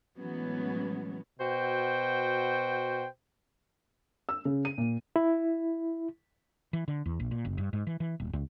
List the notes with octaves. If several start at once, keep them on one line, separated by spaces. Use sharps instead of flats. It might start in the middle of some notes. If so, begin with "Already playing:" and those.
A2 E3 F#3 G#3 B3 C#4
B2 F#4 C5 G5
E6
C#3
D#7
A#2
E4
E3
D3
E2
A#1
A#2
F#1
G2
G#2
E3
E3
D#1
C#2